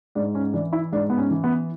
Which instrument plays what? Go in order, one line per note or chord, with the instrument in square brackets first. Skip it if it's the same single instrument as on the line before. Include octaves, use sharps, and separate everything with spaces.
[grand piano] G#2 D4
C#4
E3 D4
E4
G#2 D4
B3
C#4
E3
B3